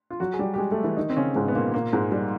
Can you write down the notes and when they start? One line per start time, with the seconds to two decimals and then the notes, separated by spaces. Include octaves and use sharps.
0.10 F4
0.20 F#3 F#4
0.33 G#4
0.39 G3 G4
0.54 G4
0.58 G#3 G#4
0.71 A3 A4
0.84 E3 E4
0.97 D#3 D#4
1.10 C4
1.17 C#3 C#4
1.35 G#2 G#3
1.48 B3
1.55 A#2 A#3
1.74 A#2 A#3
1.93 G#2 G#3
2.12 G3